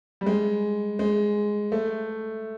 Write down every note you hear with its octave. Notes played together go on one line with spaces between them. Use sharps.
G3
G#3
G#3
A3